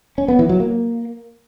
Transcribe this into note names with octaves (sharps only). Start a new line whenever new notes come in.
C#4
B3
E3
F#3
A#3